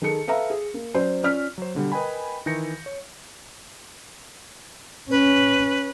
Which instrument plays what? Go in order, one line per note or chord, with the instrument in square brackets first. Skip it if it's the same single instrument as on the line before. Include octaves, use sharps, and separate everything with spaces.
[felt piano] D#3 G#4 A4 C#7
A4 B4 E5 F5 A#5
G#4
A#3
F#3 C#4 C5 D5
C#4 F4 D5 F6 B6
[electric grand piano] F#3 C5
B2 D3 G3
A#4 B4 D#5 G5 G#5 B5
D#3 E3 G6 A#6 C#7
C#5
[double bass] C#4 [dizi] B4